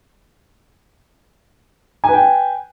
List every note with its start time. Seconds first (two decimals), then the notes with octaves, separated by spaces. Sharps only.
2.04 G#5
2.08 B4
2.13 G5